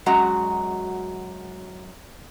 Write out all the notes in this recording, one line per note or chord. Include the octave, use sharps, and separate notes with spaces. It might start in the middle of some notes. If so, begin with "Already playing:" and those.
F#2 G#3 F#4 F#5 A#5